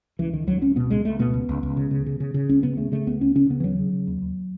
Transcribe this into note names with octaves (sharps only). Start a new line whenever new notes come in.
C#2 E3
C#2 D#3
C#2 F#3
C#2 C#4
B2 B3
C#2 G#3
C#2 A3
B2 B3
C#2
C#2
C#2
C#3
C#3
C#3
C#3
C#3
C#2 C#4
C#3 B3
C#3 A3
C#3 A3
C#2 B3
C#2 C#4
C#3 C#4
C#3 B3
E3
D#2 F#3
C#3
C#3
D#2
D#2